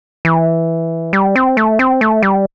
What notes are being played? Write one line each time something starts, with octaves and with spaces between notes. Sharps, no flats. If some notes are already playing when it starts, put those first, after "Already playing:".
E3
G3
C4
A3
C4
A3
G3